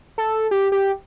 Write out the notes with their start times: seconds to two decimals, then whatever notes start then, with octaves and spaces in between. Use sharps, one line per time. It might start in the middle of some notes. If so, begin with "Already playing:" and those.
0.18 A4
0.51 G4
0.72 G4